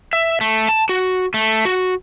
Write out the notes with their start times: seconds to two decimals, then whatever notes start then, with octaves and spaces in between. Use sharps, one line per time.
0.13 E5
0.41 A3
0.69 A5
0.89 F#4
1.34 A3
1.65 F#4